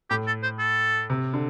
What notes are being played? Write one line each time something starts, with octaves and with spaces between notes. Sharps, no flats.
A2 G4
A4
C5
A4
C3
D3